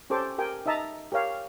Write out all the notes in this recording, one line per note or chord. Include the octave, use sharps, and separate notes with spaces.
C#4 G4 A4 C5 D6
G4 A#4 G5 G#5
D#4 D#5 E5 A5 A#5
G4 A#4 C#5 F5